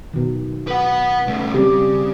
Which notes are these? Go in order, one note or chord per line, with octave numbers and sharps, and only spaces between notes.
B2 D#3
B4 F#5
C#3 A3
C#3 G3 C4 G4